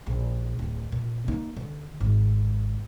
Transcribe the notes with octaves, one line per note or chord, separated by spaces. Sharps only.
A#1
D1
A#2
A#3 D#4
D3
G#1